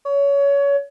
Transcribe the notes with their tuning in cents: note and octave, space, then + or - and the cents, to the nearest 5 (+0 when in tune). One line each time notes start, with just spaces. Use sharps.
C#5 +25